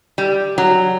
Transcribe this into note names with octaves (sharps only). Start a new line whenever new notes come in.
G3
F#3